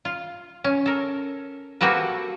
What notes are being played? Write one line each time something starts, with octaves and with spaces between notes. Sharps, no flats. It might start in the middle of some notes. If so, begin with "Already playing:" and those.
F4
C#4
A4 A#4
A#3 C4 F#4 G4 A4 B4